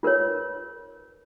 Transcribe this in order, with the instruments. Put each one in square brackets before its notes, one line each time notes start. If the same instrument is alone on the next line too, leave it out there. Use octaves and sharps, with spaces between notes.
[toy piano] F4 A#4 B4 C#5